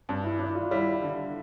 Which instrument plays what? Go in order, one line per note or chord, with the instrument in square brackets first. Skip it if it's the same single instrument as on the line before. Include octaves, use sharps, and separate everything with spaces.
[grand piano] G2 [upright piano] D4
[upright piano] E4
[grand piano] D4 [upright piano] E4
[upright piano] F4
[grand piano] G3 [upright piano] E4
[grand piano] D3